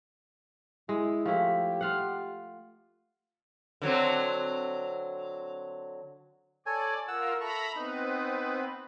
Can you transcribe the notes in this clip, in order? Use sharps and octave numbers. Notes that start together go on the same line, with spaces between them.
G#3 E4
F3 A3 E4 G4
F4 F5 F#5
D3 F#3 C4
A4 C#5 D5 G#5
F4 A#4 F#5 E6
A4 E5 A#5 B5 C#6
B3 C4 D#4 B4